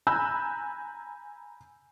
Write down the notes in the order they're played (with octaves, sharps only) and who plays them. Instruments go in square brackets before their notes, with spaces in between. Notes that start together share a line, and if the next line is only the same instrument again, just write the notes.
[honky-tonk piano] G#5 A#5 B5 E6 F#6 G6